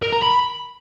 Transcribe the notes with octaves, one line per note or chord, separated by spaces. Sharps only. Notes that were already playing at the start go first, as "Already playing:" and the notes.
A#4
A#5
B5